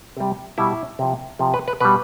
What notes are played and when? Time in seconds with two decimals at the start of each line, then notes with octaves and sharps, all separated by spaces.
0.17 C3 G3
0.58 B2 G3 E4
0.99 C3 F3
1.39 C3 F3
1.54 B4
1.68 B4
1.80 B2 G3 B4